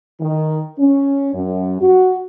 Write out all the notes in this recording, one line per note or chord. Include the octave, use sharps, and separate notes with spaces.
D#3
C#4
F#2
F#4